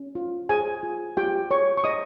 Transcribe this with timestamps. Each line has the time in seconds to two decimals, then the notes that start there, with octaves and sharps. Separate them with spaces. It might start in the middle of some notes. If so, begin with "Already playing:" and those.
Already playing: C#4
0.15 F4
0.49 G#4 C5 G#5
0.83 F4
1.17 F4 G4 G5
1.51 G#4 C#5 C#6
1.77 C#6
1.84 C5 D#5 D#6